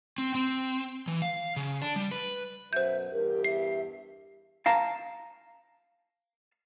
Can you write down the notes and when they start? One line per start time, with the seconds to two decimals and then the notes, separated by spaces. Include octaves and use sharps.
0.18 C4
0.35 C4
1.08 E3
1.22 F5
1.56 C#3
1.82 D4
1.96 G3
2.11 B4
2.73 F#2 B2 F#3 C5 E5 G6
3.13 E2 G2 G4 A#4
3.44 E5 C7
4.66 F5 A5 A#5